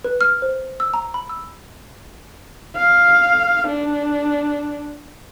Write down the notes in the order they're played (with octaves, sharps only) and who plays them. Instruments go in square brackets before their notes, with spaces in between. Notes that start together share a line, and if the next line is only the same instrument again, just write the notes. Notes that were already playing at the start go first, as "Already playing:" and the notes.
[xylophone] B4
F6
C5
E6
A#5
B5
E6
[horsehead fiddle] F5
D4